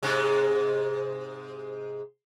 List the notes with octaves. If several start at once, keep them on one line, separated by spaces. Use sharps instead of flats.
G#2 C3 G#3